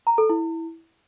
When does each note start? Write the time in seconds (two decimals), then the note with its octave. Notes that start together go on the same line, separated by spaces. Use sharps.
0.07 A#5
0.18 A4
0.29 E4